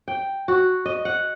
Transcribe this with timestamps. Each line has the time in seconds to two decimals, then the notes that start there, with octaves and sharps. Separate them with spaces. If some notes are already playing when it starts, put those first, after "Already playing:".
0.08 G5
0.48 F#4
0.86 D#5
1.05 F#5